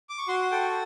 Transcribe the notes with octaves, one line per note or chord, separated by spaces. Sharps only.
D6
C#6
F#4 C6
A4 G5